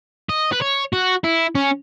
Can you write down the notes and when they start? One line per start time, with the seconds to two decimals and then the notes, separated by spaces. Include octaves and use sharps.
0.29 D#5
0.53 B4
0.62 C#5
0.93 F#4
1.24 E4
1.55 C#4